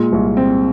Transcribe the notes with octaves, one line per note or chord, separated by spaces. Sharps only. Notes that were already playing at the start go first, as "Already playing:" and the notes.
Already playing: A#2 G#3
C2
C4